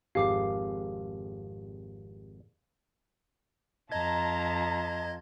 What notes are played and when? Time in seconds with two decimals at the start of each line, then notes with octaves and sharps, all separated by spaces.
0.15 G#1 F2 G4 G#4 F5 D6 C7
3.92 F2 D#5 A5 A#5 G#6